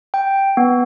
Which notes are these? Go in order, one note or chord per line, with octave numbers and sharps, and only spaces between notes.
G5
B3